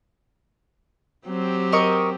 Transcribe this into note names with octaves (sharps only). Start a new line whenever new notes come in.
F#3 C4 G4
A#4 D#5 C#6